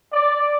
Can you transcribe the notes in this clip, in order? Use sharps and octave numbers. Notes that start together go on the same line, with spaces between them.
D5